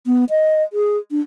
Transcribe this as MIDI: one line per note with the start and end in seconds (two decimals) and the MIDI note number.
0.07 0.25 59
0.30 0.63 75
0.73 0.97 68
1.11 1.20 62